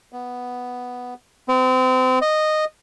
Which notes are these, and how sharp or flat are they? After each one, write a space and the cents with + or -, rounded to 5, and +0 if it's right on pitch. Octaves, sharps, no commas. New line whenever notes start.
B3 +0
C4 -30
D#5 -10